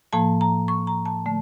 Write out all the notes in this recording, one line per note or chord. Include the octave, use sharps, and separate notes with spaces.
A2 F3 A#3 A5
A#5
C#6
A#5
A5
D3 A3